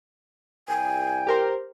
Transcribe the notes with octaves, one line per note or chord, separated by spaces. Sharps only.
C2 G5 G#5
G4 A#4 C5